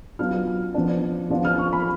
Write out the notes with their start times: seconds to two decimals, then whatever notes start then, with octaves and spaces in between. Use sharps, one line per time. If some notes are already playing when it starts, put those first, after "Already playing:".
0.19 F#3 B3 D4 F4 F6
0.74 F3 B3 D4
1.30 F3 B3 D4 F4
1.45 F6
1.59 C#6
1.73 B5